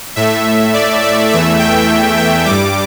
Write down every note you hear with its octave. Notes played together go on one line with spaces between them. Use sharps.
A2 A3 E5
D5
E5
E2 E3 A3 E5
G5
G5
G2 G3 D6